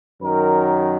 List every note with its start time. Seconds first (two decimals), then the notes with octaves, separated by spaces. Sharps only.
0.21 F#2 D#3 F#3 A#4